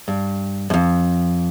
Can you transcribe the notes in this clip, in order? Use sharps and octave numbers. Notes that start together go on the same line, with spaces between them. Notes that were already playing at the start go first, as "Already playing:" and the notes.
G2
F#2
F2